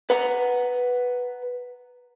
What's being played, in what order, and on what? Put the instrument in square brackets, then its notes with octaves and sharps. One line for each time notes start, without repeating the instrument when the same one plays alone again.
[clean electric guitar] B4 F#5 A#5